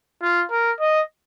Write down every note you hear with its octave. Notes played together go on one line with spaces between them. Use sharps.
F4
A#4
D#5